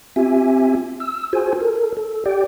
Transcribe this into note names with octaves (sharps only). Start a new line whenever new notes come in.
C4 F4 G4 E5 G#5
E6
F4 F#4 G#4 C5 G#5
A4 A#4
A4
G4 D5 G5